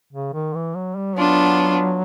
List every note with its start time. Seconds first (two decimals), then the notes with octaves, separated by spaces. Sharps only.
0.13 C#3
0.34 D#3
0.54 E3
0.75 F#3
0.96 G3
1.16 F#3 B3 D4 F4